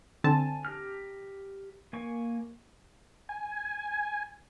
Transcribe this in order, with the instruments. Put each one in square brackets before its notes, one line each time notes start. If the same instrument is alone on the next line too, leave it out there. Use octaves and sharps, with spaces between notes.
[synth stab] D3 C4 A5 [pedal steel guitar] G#5
[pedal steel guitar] G4 A#5 F6
A#3 G#5 C#6
[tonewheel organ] G#5